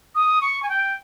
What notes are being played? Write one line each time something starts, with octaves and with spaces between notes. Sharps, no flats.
D#6
C#6
G#5
G5